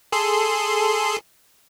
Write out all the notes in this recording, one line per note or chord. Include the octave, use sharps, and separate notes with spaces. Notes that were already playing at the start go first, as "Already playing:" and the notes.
G#4 A4 C6